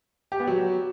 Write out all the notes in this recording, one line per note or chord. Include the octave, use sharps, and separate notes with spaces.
G4
B3
F#3